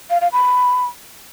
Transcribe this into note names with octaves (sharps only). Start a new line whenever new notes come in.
F5
F5
B5